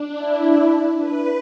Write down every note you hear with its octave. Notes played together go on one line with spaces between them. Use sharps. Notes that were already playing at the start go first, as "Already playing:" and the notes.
Already playing: D4
E4
B4